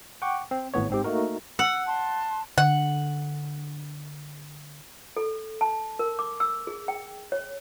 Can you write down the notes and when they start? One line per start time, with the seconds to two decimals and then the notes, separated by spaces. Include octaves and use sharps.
0.22 F#5 G5 C#6 D6
0.51 C4
0.74 G#1 A2 B3 C#5
0.89 G#2 C4 G4
1.04 A3 A#3 D#4 F#4 A#4
1.59 F#5 E6
1.87 A5 C6
2.58 D3 F#5
5.17 A4
5.61 A5
5.99 A#4
6.19 D6
6.40 E6
6.67 G#4
6.88 G5
7.32 C#5